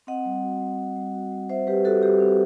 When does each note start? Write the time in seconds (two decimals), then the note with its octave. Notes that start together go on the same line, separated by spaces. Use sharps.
0.07 C4 D#5 F#5
0.25 G3
0.44 F#4
0.61 G3
0.79 C4
0.96 G3
1.14 F#4
1.31 G3
1.50 C4 C5 E5
1.67 G3 G4 B4
1.85 F#4 A4
2.03 G3 G4
2.20 C4